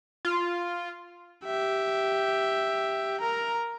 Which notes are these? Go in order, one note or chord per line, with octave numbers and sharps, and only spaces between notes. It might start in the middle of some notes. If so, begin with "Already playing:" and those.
F4
G4 E5
A#4 A#5